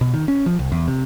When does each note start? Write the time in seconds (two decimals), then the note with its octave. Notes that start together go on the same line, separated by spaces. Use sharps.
0.01 B2
0.14 D#3
0.28 C#4
0.46 F3
0.59 C2
0.72 E2
0.88 C3